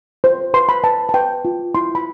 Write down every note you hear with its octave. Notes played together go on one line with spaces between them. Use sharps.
C5
B4 C6
B5
B4 A5
A5
B4 G5
F4
E4 C6
B5